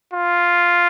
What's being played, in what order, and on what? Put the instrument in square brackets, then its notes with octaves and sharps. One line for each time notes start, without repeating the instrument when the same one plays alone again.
[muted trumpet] F4